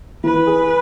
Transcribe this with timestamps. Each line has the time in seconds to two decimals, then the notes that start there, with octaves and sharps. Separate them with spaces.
0.24 E3 B4
0.47 G#4